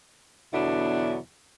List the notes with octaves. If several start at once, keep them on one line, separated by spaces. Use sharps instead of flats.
E2 B2 D3 F#3 D4 E4